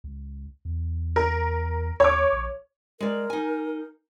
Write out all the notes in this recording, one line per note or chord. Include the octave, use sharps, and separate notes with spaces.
C#2
E2
A#4
D#2 C#5 D6
A#1
G#3 A#4 D5
D#4 G#5